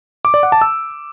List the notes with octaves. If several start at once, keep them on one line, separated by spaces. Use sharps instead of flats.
D6
D5
F#5
A5
E6